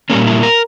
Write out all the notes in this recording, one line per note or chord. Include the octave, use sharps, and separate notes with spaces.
A#2 G3 A#3 C#4
E4
A#4